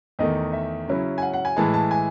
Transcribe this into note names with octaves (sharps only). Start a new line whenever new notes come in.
E2 D#3 A3 D#4 D#5
E5
C#3 F#3 C#4 E4
G#5
F#5
F#5
G#5
A2 E3 G#3 A5
A5
G#5